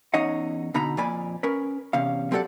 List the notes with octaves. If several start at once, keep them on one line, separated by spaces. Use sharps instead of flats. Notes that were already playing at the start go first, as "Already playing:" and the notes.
E2 C#4 D#4 C#5 D#5 F#5
B2 D3 D#4 A#5 B5
F2 A#2 D5 G#5 B5
C#4 A#4 B4
E2 C3 C#4 F5
F#3 C4 G4 A4 D5 F#5